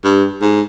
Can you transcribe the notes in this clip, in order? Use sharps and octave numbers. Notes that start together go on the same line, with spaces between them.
G2
G#2